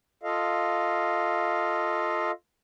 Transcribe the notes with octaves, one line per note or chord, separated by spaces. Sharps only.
F4 A4 D#5 F5